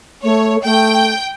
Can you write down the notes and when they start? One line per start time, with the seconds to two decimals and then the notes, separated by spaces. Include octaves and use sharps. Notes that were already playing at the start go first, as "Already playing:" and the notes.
0.23 A3 C#5
0.64 A3 G5